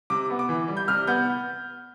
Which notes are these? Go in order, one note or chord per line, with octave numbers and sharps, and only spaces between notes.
C3 D6
B3
D6
E3
G3
G6
C3 F6
B3 G6